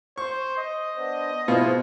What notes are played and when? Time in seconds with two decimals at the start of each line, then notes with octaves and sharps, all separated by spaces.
0.18 C5 C#6
0.58 D#5
0.96 B3 D4 C5
1.48 G#2 B2 E4 F4 C5